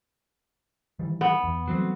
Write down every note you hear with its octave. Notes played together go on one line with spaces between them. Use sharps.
D#3 E3 G3
B3
E2
E3 F#3 G3 A3 C4